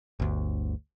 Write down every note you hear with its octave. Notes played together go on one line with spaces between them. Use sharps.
G1 D2